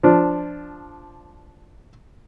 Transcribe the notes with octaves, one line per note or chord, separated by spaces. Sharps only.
F3 D4